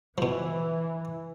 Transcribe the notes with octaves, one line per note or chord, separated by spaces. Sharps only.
B2 E3 F3